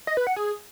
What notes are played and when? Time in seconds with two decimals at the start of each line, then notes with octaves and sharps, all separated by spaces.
0.07 D#5
0.17 B4
0.27 F#5
0.36 G#4